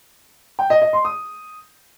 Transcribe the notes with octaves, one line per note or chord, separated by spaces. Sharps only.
G5
D#5
D#5
C6
D#6